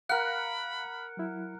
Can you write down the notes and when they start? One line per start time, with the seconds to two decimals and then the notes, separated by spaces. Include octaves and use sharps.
0.09 A#4 F5 F#5 B5 F6 F#6
1.17 F#3 E4